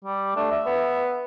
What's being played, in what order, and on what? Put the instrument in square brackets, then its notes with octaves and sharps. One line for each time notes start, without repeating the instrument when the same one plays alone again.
[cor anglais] G3
[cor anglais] A3 [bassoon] D4
[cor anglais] E5
[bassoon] B3